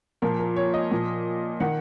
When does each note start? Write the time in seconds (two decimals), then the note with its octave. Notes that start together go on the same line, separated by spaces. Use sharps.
0.22 A#2 F3 A#4
0.39 A#4
0.56 C#5
0.74 D#5
0.91 A#2 F3
1.60 D#3 F#5